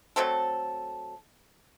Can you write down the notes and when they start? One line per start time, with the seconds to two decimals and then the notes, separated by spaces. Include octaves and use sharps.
0.16 F#3 A3 C4 A4